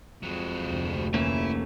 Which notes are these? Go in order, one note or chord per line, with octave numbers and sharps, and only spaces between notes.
F2 F#3 G#3
F1 D2
E3 A3 A#3 C#4 E4